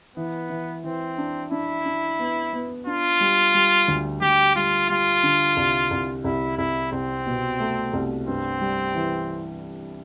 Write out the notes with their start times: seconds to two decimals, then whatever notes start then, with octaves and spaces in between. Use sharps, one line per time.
0.16 E3 B3
0.50 E3
0.84 E3 C4
1.18 D4
1.52 D4 E4
1.86 D4
2.19 B3
2.53 B3
2.87 D4 F4
3.20 G3
3.54 G3
3.88 D2
4.21 D2 G4
4.56 G3 F4
4.89 G3 F4
5.23 D3
5.57 C2
5.91 C2
6.24 C2 E4
6.58 C2 E4
6.92 C2 C4
7.26 B2
7.60 A3
7.93 C2
8.27 G2 C4
8.61 G3
8.95 E3